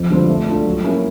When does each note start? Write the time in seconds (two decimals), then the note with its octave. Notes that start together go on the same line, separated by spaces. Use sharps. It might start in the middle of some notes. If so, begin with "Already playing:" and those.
Already playing: F2
0.10 D3 G3 C4 F4
0.29 A3
0.46 D4 F4 A4
0.66 F#3
0.84 A#3 C#4 E4 G#4